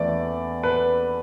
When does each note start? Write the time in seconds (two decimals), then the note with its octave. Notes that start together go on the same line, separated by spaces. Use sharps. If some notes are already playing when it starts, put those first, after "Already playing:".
Already playing: E2 E3 A3 D5
0.63 B4